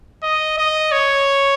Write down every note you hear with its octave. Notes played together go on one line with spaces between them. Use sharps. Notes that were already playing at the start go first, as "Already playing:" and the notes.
D#5
D#5
C#5